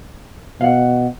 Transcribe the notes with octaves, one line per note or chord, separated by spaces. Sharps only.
B2 F5 F#5